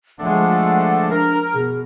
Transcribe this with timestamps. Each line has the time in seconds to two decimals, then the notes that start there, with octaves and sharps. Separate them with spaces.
0.20 F3 G#3 A3 D4 A4 F#5
1.10 D4 A#4
1.54 B2 G#4